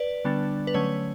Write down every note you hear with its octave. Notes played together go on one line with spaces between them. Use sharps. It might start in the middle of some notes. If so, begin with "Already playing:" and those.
Already playing: B4 D5
D3 G3 B3 D4
B4
D3 F#3 A3 C#4 C#5